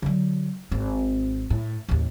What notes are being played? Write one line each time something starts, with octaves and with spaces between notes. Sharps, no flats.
D3 F#3
G#1 C4
A2
A1 D#2